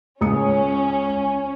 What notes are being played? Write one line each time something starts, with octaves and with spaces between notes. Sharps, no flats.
C#2 C#4 D#6 C#7